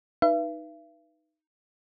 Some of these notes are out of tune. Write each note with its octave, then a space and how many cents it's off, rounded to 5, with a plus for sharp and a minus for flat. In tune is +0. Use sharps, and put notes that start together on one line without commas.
D#4 +0 B4 -10 E5 +45